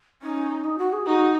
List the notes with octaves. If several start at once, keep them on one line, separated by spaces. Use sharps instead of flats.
C#4 D#4
D#4
F#4
G#4
D#4 F#4